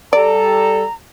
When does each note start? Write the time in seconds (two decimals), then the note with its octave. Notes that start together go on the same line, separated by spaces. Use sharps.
0.13 G3 A4 D5 A#5